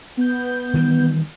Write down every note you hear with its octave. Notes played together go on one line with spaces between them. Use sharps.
B3 G6
D#3 E3 G3